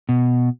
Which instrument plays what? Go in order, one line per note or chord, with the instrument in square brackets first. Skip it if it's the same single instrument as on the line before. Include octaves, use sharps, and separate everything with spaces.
[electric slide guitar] B2